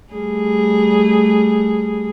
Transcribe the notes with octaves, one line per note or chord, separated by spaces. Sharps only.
G3 A3 G#4